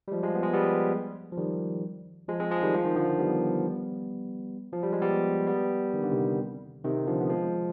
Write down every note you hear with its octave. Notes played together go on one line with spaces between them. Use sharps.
G3
F3 G#3
F3 G#3
B3
G#3
G3 B3
F3
D#3 G3
F3 G#3
G#3 C4
F3 G#3
D#3 G3
F3
D#3
D3 F3
G3 B3
F3
G3
G#3
G3 B3
G3 B3
D#3
D3
C3 D#3
C3 D#3
D3 F3
B3
F3 G#3